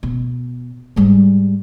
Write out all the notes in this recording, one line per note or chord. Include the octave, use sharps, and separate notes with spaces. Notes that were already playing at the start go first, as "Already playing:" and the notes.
B2
G#2 G3